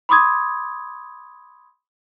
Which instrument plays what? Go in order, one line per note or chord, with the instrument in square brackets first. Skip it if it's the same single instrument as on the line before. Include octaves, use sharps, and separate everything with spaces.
[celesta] B5 C6 D6 D#6 G#6